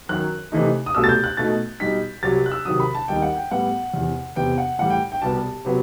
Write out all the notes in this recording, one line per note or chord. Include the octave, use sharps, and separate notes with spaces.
F#2 D#3 F#3 F#6
C3 E3 A3 D#4
D#6
C2 B2 A3 E6
A6
G6
F#6
B2 A3 D#4 A6
B2 G3 D#4 B6
C2 C3 F#3 A6
F#6
E6
C3 D#3 F#3 D#6
B5
A5
D#2 D#3 G3 D#4 G5
F#5
G5
A2 G3 B3 F#5
E2 C3 E3
E2 C3 E3 B3 G5
F#5
A2 E3 G3 F#5
G5
G5
C2 B2 G3 B3 A5
C3 F#3 B3